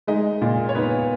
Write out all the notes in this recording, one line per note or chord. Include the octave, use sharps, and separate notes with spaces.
G#3 D#4 D#5
A#2
C#5
B3 D#4 B4